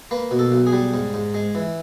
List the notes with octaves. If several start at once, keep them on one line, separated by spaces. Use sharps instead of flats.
A#3 B4
B2
A4
B1
G#4
G3
G#2
G#2
G#3
E3